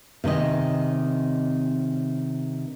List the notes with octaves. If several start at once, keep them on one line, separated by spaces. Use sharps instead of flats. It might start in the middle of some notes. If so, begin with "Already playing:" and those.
C3 D#3 C#4 D#5